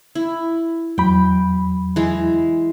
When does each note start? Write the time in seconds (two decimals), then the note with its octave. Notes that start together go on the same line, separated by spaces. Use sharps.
0.15 E4
0.98 E2 F#3 G5 B5
1.96 E3 G#3